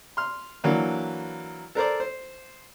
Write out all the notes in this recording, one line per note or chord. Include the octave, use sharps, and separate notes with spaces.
C6 F6
E3 F#3 A#3 D4
A4 A#4 C5 D5
C5